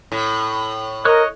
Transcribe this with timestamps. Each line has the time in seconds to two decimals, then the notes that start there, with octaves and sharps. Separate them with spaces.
0.12 A2
1.05 A#4 C#5 D#5 C#6 F#6